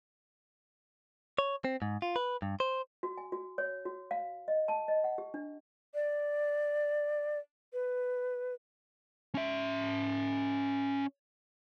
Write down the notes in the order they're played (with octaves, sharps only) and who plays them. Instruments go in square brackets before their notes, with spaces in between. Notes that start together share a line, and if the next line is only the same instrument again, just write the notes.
[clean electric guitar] C#5
C4
G#2
F4
B4
G2
C5
[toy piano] F#4
G#5
F#4
C#5
F#4
F5
D#5
A5
D#5
F#5
G4
D4
[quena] D5
B4
[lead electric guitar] C#4 E5